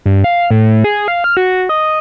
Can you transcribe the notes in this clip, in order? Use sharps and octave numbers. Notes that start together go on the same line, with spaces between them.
G2
F5
A2
G#4
F5
F6
F#4
D#5